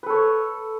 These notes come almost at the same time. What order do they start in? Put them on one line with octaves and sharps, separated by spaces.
B4 A4 C#5